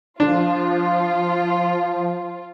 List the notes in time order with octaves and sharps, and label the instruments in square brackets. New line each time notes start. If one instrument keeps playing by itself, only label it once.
[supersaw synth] F3 [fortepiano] D4 [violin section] F4